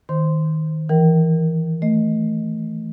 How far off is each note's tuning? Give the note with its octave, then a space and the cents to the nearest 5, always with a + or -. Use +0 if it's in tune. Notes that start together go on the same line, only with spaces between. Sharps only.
D#3 +15 C5 +0 C6 -10
E3 +0 A#4 +0 G5 -30
A3 +0 D#5 +0